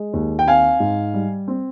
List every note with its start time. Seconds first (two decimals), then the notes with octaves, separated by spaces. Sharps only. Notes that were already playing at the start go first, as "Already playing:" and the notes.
Already playing: G#3
0.13 D#2
0.39 G5
0.47 C4 F5 G#5
0.80 G#2
1.14 G3
1.48 C4